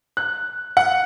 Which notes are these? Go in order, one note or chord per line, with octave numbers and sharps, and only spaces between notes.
F#6
F#5